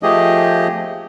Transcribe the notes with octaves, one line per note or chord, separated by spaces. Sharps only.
F3 A3 G4 G#4 D#5